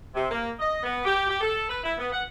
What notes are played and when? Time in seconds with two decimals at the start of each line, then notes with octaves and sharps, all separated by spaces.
0.15 C3
0.31 A#3
0.59 D#5
0.83 B3
1.05 G4
1.28 G4
1.41 A4
1.70 B4
1.84 E4
1.98 B3
2.12 F#5